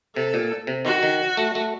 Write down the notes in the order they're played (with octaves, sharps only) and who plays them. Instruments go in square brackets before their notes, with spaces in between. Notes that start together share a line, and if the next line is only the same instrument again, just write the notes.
[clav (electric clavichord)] C3 [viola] A4
[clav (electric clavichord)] A#2
C3
[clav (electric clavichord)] D#3 [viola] F#4
[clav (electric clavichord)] D#3
A3
A3